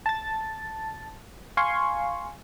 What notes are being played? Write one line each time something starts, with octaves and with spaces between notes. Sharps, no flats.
A5 A6
F5 G#5 C6 C#6